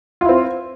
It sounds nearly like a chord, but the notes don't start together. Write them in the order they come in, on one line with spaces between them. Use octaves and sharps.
F4 E4 C4